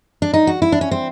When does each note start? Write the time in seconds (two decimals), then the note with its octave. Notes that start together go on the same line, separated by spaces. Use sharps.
0.22 D4
0.34 D#4
0.47 F#4
0.62 E4
0.72 D4
0.81 C#4
0.91 C4